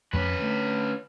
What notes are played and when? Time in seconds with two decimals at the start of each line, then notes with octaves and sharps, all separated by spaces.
0.13 F2 C#4 B4
0.37 D3 A3